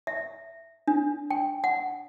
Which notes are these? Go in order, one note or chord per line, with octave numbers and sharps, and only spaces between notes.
E5
D4
G5
F#5